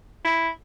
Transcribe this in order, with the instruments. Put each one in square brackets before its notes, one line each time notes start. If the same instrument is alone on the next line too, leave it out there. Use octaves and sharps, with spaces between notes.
[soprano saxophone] E4